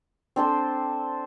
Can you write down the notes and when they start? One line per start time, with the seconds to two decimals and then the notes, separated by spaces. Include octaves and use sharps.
0.36 C4 D4 A4 C5